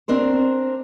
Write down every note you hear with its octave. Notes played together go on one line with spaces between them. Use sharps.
C4 D4 A#4 C5